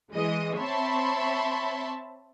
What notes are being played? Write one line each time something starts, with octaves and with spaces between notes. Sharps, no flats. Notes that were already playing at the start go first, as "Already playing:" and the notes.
E3 G#3 D#5
C4 C#5 E5 A5 B5 C6